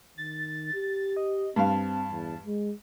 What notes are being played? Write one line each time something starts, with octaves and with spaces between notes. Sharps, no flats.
D#3 A6
G4
D#5
G2 C4 F5 A5
E2
G#3